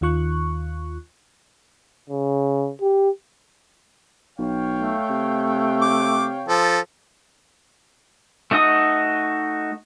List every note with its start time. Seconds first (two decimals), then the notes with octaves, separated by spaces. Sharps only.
0.01 D#2 D#3 F4 C#6 F#6
2.10 C#3
2.81 G4
4.39 B1 C#5 F5 G5
4.76 A3
5.10 C3
5.82 D6
6.48 F3 A4
8.51 A3 D#4 F#4 D#5 D#6